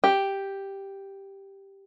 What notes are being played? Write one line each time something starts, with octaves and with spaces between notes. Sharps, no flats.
G4